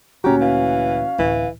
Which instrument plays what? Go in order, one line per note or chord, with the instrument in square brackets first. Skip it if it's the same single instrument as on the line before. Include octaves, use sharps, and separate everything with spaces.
[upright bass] D2 A#2 [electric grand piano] C#4 F#4 [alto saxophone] G4 [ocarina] A#5
[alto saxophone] E3 [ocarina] F5
[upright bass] D1 [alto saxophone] E3